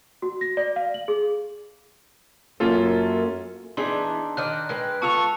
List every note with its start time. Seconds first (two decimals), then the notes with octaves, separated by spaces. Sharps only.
0.22 F#4
0.41 A#6
0.57 D5
0.76 F5
0.94 F#7
1.08 G#4
2.60 F#2 A#3 C#4 F4 F#4 A4
3.77 E3 B3 D4 D#4 G#4 C6
4.37 D#3 D5 D#5 F6 F#6
4.69 G#3 B4 G5 F#6
5.02 B3 F4 A4 A5 C#6 E6 F7